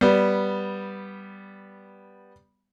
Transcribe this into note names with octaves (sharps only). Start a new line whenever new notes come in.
G3 B3